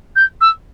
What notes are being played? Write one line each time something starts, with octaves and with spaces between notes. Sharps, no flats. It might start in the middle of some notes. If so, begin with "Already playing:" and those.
G6
E6